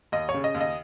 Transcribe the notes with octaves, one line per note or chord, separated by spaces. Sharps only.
D#2 D#5
C#5
C#3
D#5
D#2
D#5